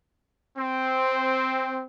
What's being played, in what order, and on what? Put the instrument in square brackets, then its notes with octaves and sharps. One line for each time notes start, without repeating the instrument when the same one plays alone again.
[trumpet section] C4